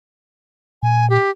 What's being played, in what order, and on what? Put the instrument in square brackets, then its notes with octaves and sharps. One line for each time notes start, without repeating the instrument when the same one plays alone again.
[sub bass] A#2 [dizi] G#5
[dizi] G4